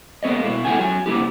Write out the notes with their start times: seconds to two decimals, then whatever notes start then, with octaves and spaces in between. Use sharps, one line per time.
0.23 G#3 A#3 B3 C#5 D#5
0.44 B2 E4
0.65 A3 B3 E4 G#4 G5 G#5
0.78 F#3 G#5
1.06 C3 A#3 E4 G4